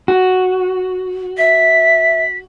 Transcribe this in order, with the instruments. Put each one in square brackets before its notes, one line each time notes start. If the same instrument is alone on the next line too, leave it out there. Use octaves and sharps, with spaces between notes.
[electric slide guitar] F#4
[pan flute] E5 [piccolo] B6